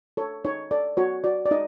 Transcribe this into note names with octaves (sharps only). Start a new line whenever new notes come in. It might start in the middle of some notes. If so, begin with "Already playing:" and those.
A4 C#5
D#4 C#5
A4 D5
F#4 C#5
F#4 D5
D5
D#4 D#5